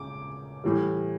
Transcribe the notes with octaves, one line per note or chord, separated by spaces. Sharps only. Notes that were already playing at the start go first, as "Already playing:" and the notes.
Already playing: C#3 D6
A2 E3 G3